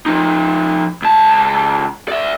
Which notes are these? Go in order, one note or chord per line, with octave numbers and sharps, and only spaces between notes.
F3 D#4
C#2 A5
D5 E5